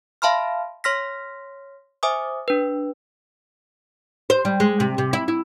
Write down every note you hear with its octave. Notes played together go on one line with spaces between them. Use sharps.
E5 F5 A5 B5 C6 F6
C#5 C6 F6 A#6 B6
C5 E5 G#5 D6 D#6
D4 B4
C5
G3
G#3
C3
C3
E4
E4